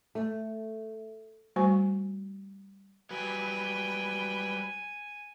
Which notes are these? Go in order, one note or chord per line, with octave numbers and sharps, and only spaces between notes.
A3
G3 A3 F#4 C5 G#5 C#6
F#3 G3 B4 G5 G#5